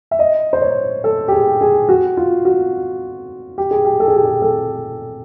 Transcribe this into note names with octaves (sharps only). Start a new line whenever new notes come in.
E5
D#5
C5
C#5
A4
G4
G#4
G#4
F#4
F4
F#4
G4
G#4
G4
A4
G#4
G4
G#4
A4